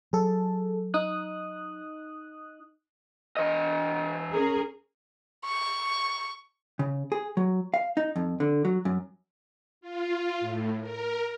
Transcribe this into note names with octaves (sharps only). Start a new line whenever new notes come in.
F#3 G#4 A4
D#4 D#6 F#6
E3 D#5
C#4 G#4 A#4
C#6
C#3
G#4
F#3
F5
D#4
F2
D3
F#3
F#2
F4
A2
A#4